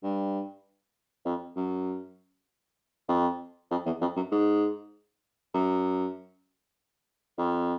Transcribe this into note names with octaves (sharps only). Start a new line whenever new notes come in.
G2
F2
F#2
F2
F2
E2
F2
F#2
G#2
F#2
F2